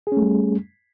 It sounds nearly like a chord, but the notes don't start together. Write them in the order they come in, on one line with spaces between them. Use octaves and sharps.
G#4 C#4 A3 G3